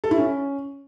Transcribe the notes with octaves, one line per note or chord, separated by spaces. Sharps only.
A4
E4
C#4